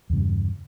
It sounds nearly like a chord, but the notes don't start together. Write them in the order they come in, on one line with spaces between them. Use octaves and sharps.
E2 C#3 G2